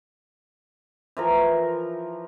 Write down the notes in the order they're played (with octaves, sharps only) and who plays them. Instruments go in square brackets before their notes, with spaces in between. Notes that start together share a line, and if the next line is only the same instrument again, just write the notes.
[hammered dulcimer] E3 F3 A#4